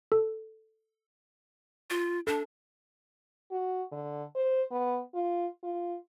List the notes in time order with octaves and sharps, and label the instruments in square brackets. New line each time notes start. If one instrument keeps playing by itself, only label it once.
[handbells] A4
[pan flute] F4
[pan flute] D4 [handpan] A4
[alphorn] F#4
D3
C5
B3
F4
F4